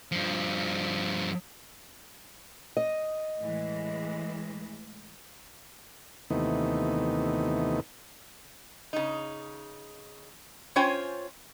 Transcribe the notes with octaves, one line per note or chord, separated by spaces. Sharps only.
G2 F3
D#5
A2 E3 G#3
D#2 C3 E3 A3 B3 D#4
C#3 D#4
C#4 F4 C5 C#5 G5 G#5